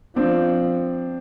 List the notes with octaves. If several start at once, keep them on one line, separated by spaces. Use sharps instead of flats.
F3 C4 D4